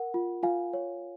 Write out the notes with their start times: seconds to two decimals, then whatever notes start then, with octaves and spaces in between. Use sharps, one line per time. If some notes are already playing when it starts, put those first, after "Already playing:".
Already playing: A#4 F#5
0.14 F4
0.43 F4 F5 G#5
0.73 C#5